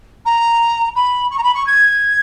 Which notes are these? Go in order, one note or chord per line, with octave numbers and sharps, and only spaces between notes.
A#5
B5
C#6
A#5
B5
C#6
G#6